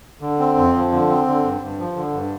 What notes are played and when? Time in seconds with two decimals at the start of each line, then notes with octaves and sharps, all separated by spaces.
0.21 D3
0.39 C4
0.57 F2
0.74 F3
0.92 D3
1.09 C4
1.27 D3
1.44 G2
1.62 G2
1.79 F3
1.96 D3
2.13 G2